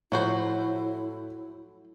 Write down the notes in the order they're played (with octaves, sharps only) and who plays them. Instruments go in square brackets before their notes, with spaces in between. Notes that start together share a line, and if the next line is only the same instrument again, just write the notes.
[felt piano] A2 F3 [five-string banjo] F#3 F#4 C5 [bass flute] E4